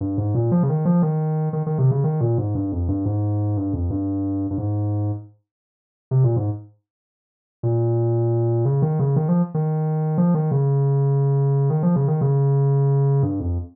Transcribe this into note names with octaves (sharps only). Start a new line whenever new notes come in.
G2
G#2
A#2
F3
C#3
D#3
F3
D#3
D#3
D#3
C3
C#3
D#3
A#2
G#2
G2
F2
G2
G#2
G2
F2
G2
G2
G#2
C3
A#2
G#2
A#2
C#3
D#3
C#3
D#3
F3
D#3
F3
D#3
C#3
D#3
F3
C#3
D#3
C#3
G2
F2